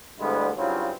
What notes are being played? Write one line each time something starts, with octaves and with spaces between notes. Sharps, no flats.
D2 G2 G#3 B3 E4 C5
G2 C#3 F#3 C4 E4 F4